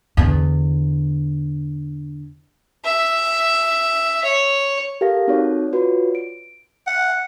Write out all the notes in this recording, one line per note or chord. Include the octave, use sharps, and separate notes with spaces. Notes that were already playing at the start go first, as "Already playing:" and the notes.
E2 D3
E5
C#5
G4 A4 A#4 F5 F#5 A#6
C4 D#4 F#4 A4 C#5 D5
F4 F#4 B4 C#5 D5
D7
F#5